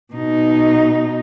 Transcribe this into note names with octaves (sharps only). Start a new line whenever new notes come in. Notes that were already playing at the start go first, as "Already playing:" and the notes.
B2 D#4